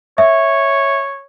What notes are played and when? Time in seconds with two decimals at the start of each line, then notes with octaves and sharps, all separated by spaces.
0.18 C#5 E5